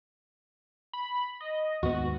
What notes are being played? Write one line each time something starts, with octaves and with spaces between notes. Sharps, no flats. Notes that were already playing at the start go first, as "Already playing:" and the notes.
B5
D#5
D#2 G#2 B3 F#4